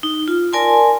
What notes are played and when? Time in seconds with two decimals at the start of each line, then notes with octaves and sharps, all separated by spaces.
0.03 D#4
0.28 F4
0.53 A#4 D5 G#5 A5 C6